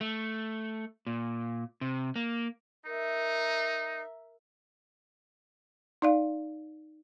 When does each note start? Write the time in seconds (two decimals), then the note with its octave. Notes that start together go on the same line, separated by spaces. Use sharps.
0.01 A3
1.07 A#2
1.81 C3
2.16 A#3
2.86 D#4 A#4 E5
6.02 D#4 D5 F5